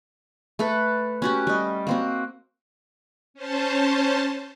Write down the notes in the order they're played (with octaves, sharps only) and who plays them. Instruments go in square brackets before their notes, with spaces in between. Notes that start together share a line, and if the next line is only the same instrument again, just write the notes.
[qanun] A3 A4 B4
C#4 F#4 G4
G3 D#5
A#3 C4 F#4
[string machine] C#4 C5 A5